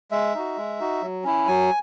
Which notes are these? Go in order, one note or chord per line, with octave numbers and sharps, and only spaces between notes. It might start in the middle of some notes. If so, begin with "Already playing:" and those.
G#3 E5
D#4 F#4
G#3
D#4 F#4
F#3
C#4 E4
F#3 G#5